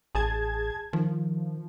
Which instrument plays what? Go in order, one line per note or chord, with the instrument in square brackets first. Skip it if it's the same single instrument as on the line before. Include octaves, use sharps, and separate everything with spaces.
[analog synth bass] A1 [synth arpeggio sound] G#4 A5 G#6
[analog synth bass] D#3 [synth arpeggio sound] F3